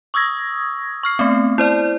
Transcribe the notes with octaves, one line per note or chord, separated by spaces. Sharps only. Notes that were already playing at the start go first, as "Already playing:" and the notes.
C#6 D#6 E6 G#6 A#6
C#6 F6 C7
A3 B3 C4
E4 C5 D5